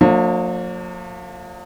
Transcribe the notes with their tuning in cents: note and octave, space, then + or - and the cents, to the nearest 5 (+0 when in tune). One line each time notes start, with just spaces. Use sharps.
F3 +40 A#3 -35 D4 +0